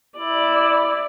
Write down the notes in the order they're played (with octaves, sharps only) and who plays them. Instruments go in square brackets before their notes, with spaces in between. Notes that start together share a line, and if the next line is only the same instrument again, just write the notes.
[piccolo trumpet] E4 [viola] D5